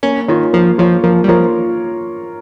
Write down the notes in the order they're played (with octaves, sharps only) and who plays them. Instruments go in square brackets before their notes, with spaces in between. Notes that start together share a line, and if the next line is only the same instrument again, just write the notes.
[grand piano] A#3 [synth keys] C#4
[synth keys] D#3 [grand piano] F4 A#4 C#5
[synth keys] F3 [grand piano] A#3
[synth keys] F3 [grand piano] F4 A#4 C#5
[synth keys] F3 [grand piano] A#3
[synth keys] G3
[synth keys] F3 [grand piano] F4 A#4 C#5